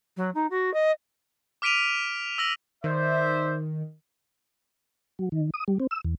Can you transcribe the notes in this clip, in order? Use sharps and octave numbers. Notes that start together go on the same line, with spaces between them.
F#3
D#4
F#4
D#5
D6 F6 B6 D7 D#7 F7
E6 A#6 F#7
D#3 C5 D5 E5
F#3
D#3
D#6
G3
C4
E6
E2